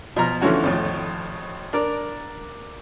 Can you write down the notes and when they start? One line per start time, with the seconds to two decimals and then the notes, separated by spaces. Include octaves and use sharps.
0.16 B2 F3 A#5 F6
0.41 D3 E3 F3 A3 C#4 F#4
0.63 G#1 F2 A2
1.73 D4 A#4 D5